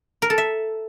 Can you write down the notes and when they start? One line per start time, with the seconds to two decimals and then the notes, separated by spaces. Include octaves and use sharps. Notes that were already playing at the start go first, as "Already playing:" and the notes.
0.22 A#4
0.30 A4
0.38 E5